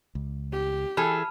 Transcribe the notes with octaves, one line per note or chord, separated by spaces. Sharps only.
C#2
G4
E3 G#4 A4 A5 B5 F6